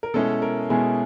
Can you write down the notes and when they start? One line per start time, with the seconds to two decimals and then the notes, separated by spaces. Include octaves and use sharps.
0.03 A#4
0.14 B2 G#3 C#4 E4 A4
0.42 A#4
0.70 B2 G#3 C#4 E4 G#4